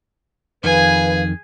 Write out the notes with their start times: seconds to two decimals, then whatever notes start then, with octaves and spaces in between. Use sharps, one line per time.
0.64 F2 D#3 G#4 B4 F5 G#5